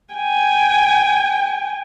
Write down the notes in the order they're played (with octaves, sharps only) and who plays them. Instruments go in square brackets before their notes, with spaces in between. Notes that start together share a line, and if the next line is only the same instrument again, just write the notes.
[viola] G5 G#5